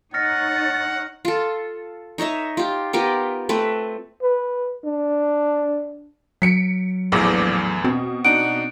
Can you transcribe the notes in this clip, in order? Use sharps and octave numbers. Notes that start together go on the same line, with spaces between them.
D#4 C#5 F#5 F6 A6 A#6 C#7
F4 A4
D#4 C#5 D#5 E5
F4 G4
B3 F4 G4 A#4
A3 C4 B4
B4
D4
F#3 B6 C#7 D7
A#1 E2 A2 E3 D6 A#6
B2 C4
D4 D#4 F#5 D7